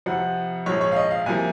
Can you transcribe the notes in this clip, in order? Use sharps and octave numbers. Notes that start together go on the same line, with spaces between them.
F2 C3 F3 F#5
A#1 G#2 F3 G#3 C#5
C#5
F5
D#5
F5
C2 C3 F3 A#3 G#5